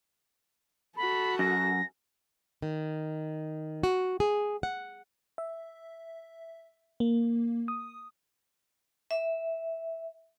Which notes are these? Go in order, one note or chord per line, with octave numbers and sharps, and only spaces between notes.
F#4 A4 B5
F#2 A#6
D#3
F#4
G#4
F#5
E5
A#3
D#6
E5